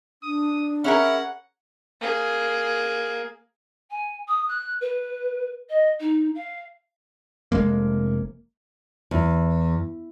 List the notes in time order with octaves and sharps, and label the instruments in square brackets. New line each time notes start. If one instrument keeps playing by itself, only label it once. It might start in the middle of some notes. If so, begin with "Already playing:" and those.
[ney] D4 [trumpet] D#6
[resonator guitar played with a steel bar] C#4 G#4 A#4 [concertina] E5 B5 F6 [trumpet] F#5
[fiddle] A#3 G#4
[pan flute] G#5
D#6
F#6
B4
D#5
D#4
F5
[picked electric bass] F1 E2 G#3 A#3
[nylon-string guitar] E2